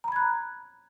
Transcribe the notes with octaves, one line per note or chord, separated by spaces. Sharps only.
A#5 B5 F#6 G#6